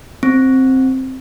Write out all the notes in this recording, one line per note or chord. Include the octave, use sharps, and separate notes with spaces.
C4